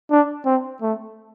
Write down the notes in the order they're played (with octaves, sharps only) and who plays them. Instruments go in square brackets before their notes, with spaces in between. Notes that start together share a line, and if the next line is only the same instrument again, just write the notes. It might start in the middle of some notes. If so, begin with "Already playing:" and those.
[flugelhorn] D4
C4
A3